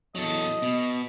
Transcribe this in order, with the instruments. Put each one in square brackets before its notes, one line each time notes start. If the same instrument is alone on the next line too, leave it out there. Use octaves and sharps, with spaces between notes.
[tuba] E2 [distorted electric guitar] F#3 A4 [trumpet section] D#5
[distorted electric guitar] B2 [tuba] B3